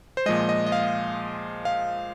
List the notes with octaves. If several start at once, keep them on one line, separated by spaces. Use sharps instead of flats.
C5
A#2 F3 G#3 D#5
D#5
D#5
F5
F5